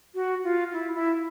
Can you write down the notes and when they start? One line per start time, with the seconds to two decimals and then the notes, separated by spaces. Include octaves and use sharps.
0.15 F#4
0.44 F4
0.73 E4
0.94 E4